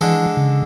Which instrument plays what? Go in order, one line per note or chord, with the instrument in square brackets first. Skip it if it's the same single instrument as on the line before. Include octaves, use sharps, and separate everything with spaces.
[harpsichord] D3 G#3 D4 A4 [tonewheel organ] E3
[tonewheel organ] C#3